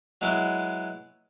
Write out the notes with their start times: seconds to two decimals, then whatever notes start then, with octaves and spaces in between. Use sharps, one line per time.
0.21 F#3 G#3 B3 E4